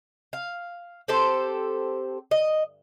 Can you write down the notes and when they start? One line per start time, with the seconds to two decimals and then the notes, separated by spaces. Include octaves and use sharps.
0.33 F5
1.08 C4 G4 A4 C5
2.31 D#5